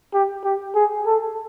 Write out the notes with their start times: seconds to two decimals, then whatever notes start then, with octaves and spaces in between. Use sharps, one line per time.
0.14 G4
0.44 G4
0.75 G#4
1.06 A4